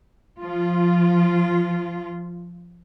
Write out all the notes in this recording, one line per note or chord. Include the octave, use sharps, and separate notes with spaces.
F3 F4